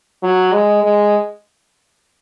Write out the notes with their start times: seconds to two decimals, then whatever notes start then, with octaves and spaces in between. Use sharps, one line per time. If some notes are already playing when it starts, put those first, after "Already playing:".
0.23 F#3
0.53 G#3
0.84 G#3